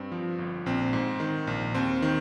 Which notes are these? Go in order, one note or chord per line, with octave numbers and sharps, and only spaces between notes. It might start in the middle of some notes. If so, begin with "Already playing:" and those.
Already playing: G2 C4
F3
G1
A#1 C4
G#2
D#3
A#1
D#2 C4
D#3